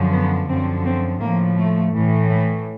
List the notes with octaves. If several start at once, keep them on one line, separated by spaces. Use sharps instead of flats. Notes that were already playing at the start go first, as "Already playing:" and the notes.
Already playing: F#2 D3 F3
B3
F#2 D3 F3 C4
C4
A2 F3 A#3
A3
A2 E3
A3